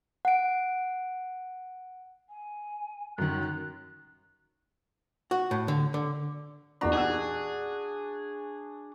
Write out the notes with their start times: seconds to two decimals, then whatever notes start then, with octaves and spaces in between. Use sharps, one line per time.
0.25 F#5 D7
2.30 G#5
3.18 F#2 D#3 F#6
5.31 F#4
5.51 A2
5.68 D3
5.94 D3
6.81 E2 A#2 D4 F#4 A#5
6.93 D#4 G4 G#4 E6